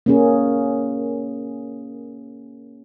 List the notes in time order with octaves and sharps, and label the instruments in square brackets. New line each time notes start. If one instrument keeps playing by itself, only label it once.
[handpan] A#3 C#4 G#4